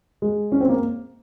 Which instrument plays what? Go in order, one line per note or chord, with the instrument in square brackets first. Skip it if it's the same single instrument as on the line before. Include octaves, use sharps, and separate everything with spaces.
[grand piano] G#3
C#4
C4
A#3